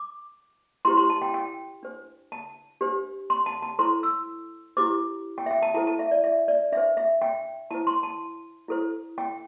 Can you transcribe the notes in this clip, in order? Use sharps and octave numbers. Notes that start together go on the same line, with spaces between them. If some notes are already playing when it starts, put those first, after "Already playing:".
Already playing: D6
E4 G4 C5 C6
C6
A5
G5
G5
D4 C5
A5
D4 G4 C5
C6
A5
A5
E4 A4 C5 C6
E6
E4 G4 C5 D6
G5
E5
G5
A5
E4 A4 C5 A5
A5
E5
D5
E5
D5
D4 C5 E5
E5
G5
E4 C5 A5
C6
A5
E4 A4 C5
G5